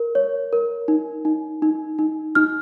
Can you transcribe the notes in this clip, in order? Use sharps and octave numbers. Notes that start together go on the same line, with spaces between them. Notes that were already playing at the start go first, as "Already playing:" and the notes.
Already playing: A#4
C#5
A#4
D#4
D#4
D#4
D#4
D#4 F6